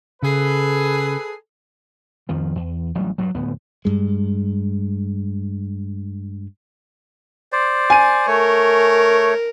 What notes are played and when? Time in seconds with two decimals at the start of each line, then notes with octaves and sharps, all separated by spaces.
0.23 C#3 G#4 A4 B4
2.29 F2 D#3 F3
2.56 E2
2.95 A1 F#3 G3
3.18 G2 F#3
3.35 D1 D#2 B3
3.85 G2 G#3
7.52 C5 D5
7.90 G#5 D#7
8.27 A3 A#4 C#5